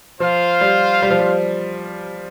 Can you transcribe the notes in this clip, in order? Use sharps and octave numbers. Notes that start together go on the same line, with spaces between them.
F3 F4 C5 F5
G3
G3
F3
G3